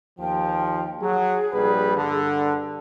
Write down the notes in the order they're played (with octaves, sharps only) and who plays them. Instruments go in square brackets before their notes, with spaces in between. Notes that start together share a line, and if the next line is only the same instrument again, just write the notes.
[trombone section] D#2 F3 [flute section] G5
[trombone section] F#3 [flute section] G#4
[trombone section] A#1 G3 B4
G2 D3